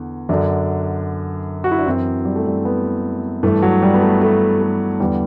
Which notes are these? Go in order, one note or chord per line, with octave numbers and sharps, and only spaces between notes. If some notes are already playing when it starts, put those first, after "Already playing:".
Already playing: E2 D3
F#2 D3 D4
F#4
E4
D4
F#2 E3 C4
G3
A3
G3
B3
G2 E3 A3
F#3
G3
B3
A3
A3
A3
E2 D3 G3